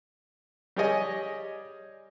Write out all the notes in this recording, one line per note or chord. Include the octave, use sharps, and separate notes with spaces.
G3 G4 G#4 C#5 D#5 G#5